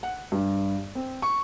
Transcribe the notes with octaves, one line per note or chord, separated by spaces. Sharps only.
F#5
G2
C4
C#6